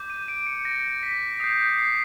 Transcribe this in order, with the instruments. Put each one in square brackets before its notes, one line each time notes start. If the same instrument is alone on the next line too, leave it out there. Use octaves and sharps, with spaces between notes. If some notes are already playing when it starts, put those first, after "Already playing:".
Already playing: [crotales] D6 G6
D#7
D7
C#7
A#6
B6
D#6 G6 C7
C7